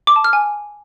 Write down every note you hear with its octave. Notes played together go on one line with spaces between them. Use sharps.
D6
A5
F6
G#5